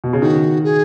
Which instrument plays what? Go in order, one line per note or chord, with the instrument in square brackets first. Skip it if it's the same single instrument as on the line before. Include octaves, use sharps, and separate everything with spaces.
[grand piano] B2
C#3
[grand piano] D#3 [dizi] F#4
[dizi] G#4